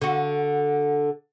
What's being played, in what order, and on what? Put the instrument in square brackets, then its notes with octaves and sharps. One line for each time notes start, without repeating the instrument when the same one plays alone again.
[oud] D3 F#4